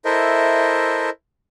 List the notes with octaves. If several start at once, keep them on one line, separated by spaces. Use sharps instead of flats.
E4 A4 A#4 C5 D#5 E5